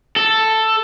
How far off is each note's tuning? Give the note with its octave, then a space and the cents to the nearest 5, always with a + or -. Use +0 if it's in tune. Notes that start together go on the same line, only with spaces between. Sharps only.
A4 +5